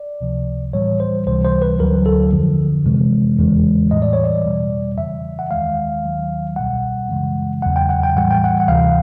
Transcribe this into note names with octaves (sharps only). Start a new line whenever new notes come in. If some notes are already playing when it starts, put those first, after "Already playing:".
Already playing: D5
C#2 C3 F3
A2 E3 G3 C#5
C5
C#2 C3 E3 G3 C5
C5
B4
D2 D3 F#3 A#4
A4
F2 D3 F3
F2 C3 E3 G#3
E2 C#3 E3 G#3
A2 E3 G3 D#5
D5
C#5
D5
E2 B2 G3
F2 C#3 E3 E5
F#5
D#2 D#3 G#3 F5
D#2 D#3 F#3
C2 B2 G3 F#5
F#2 C#3 E3 G#3
E2 C#3 F#3 F#5
G5
F#5
G5
A2 E3 G3 F#5
G5
F#5
F#5
D2 C3 E3 F5